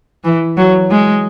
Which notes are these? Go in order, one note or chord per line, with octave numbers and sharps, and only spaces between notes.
E3
F#3
G#3